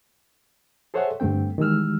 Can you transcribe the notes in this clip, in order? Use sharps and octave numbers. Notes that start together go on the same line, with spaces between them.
G#4 A4 C5 C#5 E5 F#5
G2 D3 A3 C4 G5
D#3 E3 G3 G#3 E6 F6